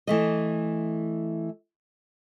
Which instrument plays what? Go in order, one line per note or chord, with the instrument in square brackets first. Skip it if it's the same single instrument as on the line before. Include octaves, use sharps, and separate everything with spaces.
[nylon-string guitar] E3 A3 D#5